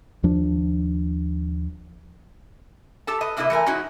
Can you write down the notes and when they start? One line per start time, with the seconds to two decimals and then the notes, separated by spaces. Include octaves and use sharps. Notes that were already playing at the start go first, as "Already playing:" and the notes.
0.23 D#2 F3 D4
3.07 G4 A4 A5
3.21 B4 D#5
3.37 A2 C3 A#3 E4 A#4 D#5
3.50 E3 A3 A#4 G#5
3.66 G#3 C#4 D#4 E4 F#4 E5